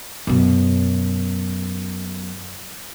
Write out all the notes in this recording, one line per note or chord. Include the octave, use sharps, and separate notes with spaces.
F#2 B2